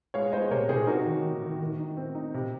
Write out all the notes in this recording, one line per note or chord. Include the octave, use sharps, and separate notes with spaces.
G#3 C#5 F5
G#3 C5 D#5
C3 A#4 C#5
C3 G#4 C5
D#4 F#4 A#4
D#3
D#3
D#3
D#3
D#4
C4
D#4
C3